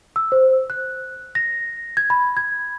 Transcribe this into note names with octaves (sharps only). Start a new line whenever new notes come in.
E6
C5
F#6
A#6
G#6
B5
G#6